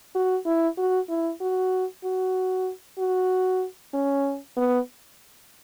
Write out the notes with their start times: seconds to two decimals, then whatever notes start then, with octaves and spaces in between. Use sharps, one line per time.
0.15 F#4
0.46 E4
0.77 F#4
1.09 E4
1.41 F#4
2.04 F#4
2.98 F#4
3.94 C#4
4.57 B3